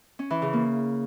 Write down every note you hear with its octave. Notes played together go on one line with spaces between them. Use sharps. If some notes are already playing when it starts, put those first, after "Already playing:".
C#4
E3
C#3
A#3